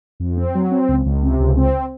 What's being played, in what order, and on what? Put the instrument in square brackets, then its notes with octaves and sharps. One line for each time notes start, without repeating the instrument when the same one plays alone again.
[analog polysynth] F2
C4
F#3
C4
C#2
C#2
C3
C#2
C4